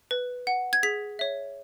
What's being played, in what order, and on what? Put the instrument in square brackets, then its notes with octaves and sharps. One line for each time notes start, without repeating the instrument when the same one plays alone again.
[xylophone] B4
F#5
G#6
G#4 B6
C#5 E5